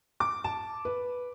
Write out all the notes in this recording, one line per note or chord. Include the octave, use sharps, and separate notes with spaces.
D6
A5
B4